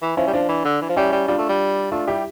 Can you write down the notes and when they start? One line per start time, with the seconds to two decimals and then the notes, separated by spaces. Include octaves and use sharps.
0.02 E3
0.17 F3 C#4 E4
0.27 G3
0.33 F3 D4
0.49 E3
0.65 D3
0.82 E3
0.89 F3
0.96 G3 C#4 E4
1.12 G3
1.28 G3 D4 F4
1.38 A3
1.49 G3
1.92 A3 D4 F4
2.07 G3 E4 G4